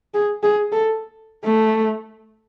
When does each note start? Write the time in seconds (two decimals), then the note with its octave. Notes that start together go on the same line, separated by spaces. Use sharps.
0.14 G#4
0.43 G#4
0.72 A4
1.44 A3